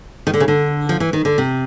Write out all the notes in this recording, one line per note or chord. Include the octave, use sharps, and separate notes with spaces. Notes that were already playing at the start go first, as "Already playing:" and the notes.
D#3
D3
C#3
D3
F3
E3
D#3
D3
C3